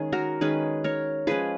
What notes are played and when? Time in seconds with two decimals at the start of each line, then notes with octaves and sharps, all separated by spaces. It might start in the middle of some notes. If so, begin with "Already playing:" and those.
Already playing: D#3 G#3 C#4 G#4
0.12 F#4 A#4
0.41 D#3 G#3 C#4 G#4 B4
0.84 A#4 C#5
1.27 F3 G#3 C#4 G#4 B4